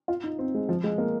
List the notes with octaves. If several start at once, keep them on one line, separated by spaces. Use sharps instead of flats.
F4
D#4
C4
G#3
F3
G#3
A#3